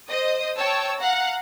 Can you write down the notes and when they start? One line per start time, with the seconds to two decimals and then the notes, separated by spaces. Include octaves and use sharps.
0.10 C5 D#5 D#6
0.58 C#5 G5 A5 E6
1.00 F5 F#5 A#5